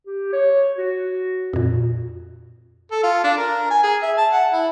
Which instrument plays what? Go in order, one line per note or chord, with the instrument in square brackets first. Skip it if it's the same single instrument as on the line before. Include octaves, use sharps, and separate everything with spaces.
[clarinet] G4
C#5
F#4
[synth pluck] F2 A#2
[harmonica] A4
F4
D4
A#4
G#5
G#4
E5
A5
F#5
E4